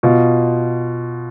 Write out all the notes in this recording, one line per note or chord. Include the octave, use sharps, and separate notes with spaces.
B2 F4